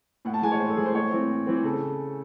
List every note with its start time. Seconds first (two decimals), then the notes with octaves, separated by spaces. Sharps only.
0.25 A2 F#5
0.34 A5
0.42 E3 G#3 G#5
0.52 C#5
0.60 A2 C5
0.69 A4
0.77 E3 G#3 G#4
0.86 C5
0.94 A2 C#5
1.12 E3 C4
1.30 A2
1.47 E3 C4
1.64 C#3 A4